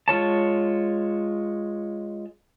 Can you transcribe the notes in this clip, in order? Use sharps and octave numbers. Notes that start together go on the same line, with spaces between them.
G#3 F4 C#5 A5